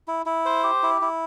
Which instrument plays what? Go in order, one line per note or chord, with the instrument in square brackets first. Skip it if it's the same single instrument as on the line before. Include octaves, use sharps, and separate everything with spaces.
[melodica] E4
E4
C5
G4
E4
E4